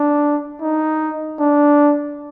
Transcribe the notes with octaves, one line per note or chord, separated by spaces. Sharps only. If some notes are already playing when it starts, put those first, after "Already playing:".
Already playing: D4
D#4
D4